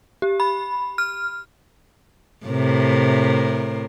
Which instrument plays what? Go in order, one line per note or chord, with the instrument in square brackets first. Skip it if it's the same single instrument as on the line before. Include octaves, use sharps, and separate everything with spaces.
[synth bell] G4
B5
F6
[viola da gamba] A2 C3 A#4